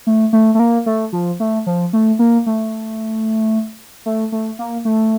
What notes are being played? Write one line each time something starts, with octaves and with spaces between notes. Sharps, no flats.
A3
A3
A3
A#3
A3
F3
A3
F3
A3
A#3
A3
A3
A3
A#3
A3